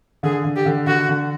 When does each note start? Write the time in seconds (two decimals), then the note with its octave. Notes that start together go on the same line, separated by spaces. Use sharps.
0.23 D3 G#4
0.45 D3
0.56 G4
0.66 D3
0.87 D3 F#4
1.09 D3